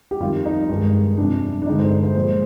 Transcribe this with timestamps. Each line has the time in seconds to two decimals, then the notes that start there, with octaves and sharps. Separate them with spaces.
0.11 G4
0.20 F2 D#3 G3 F4
0.45 D#4
0.69 G2 D#3 G#3
1.17 F2 C3 G3 D4
1.62 D4
1.66 G2 D3 G#3 D#4
1.79 C5
1.91 C5
2.03 C5
2.15 A#2 F3 G#3 C5